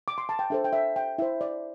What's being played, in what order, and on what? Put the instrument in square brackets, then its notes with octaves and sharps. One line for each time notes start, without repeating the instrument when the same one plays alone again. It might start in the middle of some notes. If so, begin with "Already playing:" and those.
[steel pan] D6
C6
A5
G5
D4 A4 C5 E5
G5
E5
G5
E4 C5 E5
D5